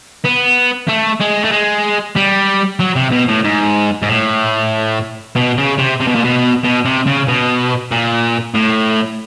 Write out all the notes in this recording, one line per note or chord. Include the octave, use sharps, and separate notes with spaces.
B3
A3
G#3
A3
G#3
G3
F#3
C3
B2
A2
G#2
G#2
A2
B2
C#3
C3
C3
B2
A#2
B2
B2
C3
C#3
B2
A#2
A2